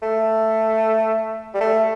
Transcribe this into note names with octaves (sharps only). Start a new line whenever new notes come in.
A3
G3
A3